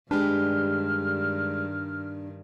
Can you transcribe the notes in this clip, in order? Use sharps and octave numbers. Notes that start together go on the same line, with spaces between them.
G2 D#3 G#3 D4 G4 B4 F6